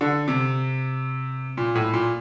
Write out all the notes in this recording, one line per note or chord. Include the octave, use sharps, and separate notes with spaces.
D3
C3
A#2
A2
A#2